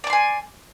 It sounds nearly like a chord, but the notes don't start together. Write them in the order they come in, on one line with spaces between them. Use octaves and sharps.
D5 D6 C6 G#5